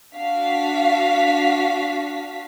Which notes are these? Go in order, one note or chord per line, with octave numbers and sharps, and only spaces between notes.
D4 F#4 F5 B6